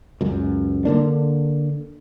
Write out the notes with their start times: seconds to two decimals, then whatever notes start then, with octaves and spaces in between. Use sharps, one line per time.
0.21 C#2 F#2
0.85 D3 E3 A#3 D4